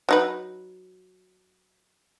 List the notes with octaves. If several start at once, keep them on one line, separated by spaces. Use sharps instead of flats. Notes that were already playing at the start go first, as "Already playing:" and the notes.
F#3 D#4 B4